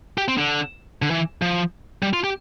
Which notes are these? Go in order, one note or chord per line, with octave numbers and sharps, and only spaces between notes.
G4
C4
D3
D3
E3
F3
G3
F4
G4